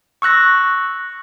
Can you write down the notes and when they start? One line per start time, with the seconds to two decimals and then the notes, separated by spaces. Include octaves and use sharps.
0.22 C#6 E6 F#6 A#6